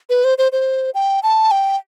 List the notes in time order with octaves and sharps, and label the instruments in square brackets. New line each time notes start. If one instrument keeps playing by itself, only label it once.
[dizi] B4
C5
C5
C5
G5
A5
G5